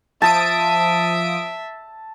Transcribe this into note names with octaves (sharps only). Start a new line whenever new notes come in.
F3 E5 A5 D#6 D7